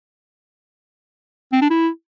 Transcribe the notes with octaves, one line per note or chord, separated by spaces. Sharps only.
C4
D4
E4